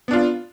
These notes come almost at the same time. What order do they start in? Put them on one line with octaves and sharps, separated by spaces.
B3 D4 F4